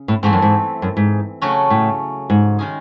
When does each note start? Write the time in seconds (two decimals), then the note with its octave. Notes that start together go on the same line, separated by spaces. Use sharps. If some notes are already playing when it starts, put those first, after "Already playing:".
Already playing: C#3
0.08 A2
0.23 G#2 E3 A3 C4
0.33 F#2
0.42 G#2
0.82 F#2
0.97 G#2
1.42 C#3 F#3 A3 C#4 F#4
1.70 A2
2.30 G#2
2.59 D#3 G#3 C#4 G#4